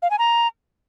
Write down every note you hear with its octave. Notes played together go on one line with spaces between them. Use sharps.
F5
G#5
A#5